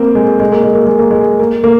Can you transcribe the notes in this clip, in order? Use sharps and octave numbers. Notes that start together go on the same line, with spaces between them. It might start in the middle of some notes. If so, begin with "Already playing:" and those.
Already playing: A#3 C4
G#3
G#3
A#3
G#3
A#3
G#3
A#3
G#3
A#3
A#3